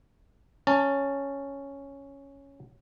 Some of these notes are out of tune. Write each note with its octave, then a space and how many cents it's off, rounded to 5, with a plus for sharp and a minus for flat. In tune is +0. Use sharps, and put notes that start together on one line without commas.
C#4 +0 A5 +20